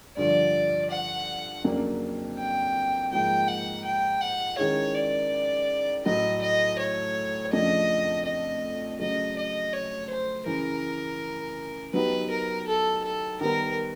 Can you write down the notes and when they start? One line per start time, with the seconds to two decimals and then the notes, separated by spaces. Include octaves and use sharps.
0.17 G2 D3 F3 D5
0.91 F#5
1.64 F2 C#3 F#3 A#3 D4
2.38 G5
3.11 G#2 F3 A#3 G5
3.48 F#5
3.85 G5
4.21 F#5
4.58 D#3 G#3 C#4 E4 G#4 C#5
4.95 D5
6.05 A2 F#3 A3 D#5
6.42 D#5
6.79 C#5
7.53 F2 C#3 F3 A3 D4 D#5
8.26 D#5
9.00 C#3 F#3 A3 D#5
9.37 D#5
9.73 C#5
10.10 C5
10.46 F#2 C#3 E3 A#4
11.94 F#3 B3 D#4 G4 B4
12.31 A#4
12.67 A4
13.04 A4
13.41 D#3 G3 B3 A#4